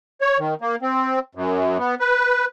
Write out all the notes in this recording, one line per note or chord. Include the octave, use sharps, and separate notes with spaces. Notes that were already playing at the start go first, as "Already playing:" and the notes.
C#5
D#3
A#3
C4
F#2
B3
B4